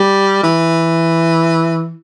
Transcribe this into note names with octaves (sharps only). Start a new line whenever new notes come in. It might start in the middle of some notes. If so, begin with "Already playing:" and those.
Already playing: G3
E3